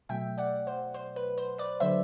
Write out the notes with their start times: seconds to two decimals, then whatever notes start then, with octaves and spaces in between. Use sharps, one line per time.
0.09 B2 F#3 A3 E5 G5
0.38 D5 F#5
0.67 C5
0.94 C5
1.16 B4
1.38 C5
1.58 B4 D5
1.80 D3 F#3 A3 C5 E5